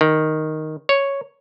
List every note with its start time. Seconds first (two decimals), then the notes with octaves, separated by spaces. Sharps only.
0.01 D#3
0.89 C#5